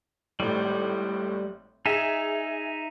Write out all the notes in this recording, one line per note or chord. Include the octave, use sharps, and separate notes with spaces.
G#1 A2 G3
D#4 G#4 E5